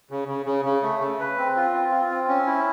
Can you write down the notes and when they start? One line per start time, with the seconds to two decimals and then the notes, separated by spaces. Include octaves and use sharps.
0.11 C#3
0.28 C#3
0.46 C#3
0.65 C#3
0.83 A3
1.01 C#3
1.20 B4
1.38 C4
1.56 F4
1.73 C4
1.91 F4
2.10 C4
2.28 C#4
2.46 E4